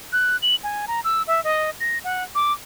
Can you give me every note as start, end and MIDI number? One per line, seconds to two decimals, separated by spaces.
0.13 0.37 90
0.42 0.55 102
0.64 0.86 80
0.88 1.00 82
1.04 1.22 88
1.27 1.43 76
1.44 1.70 75
1.80 1.98 94
2.04 2.24 78
2.35 2.53 86